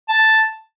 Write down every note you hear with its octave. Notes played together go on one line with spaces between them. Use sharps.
A5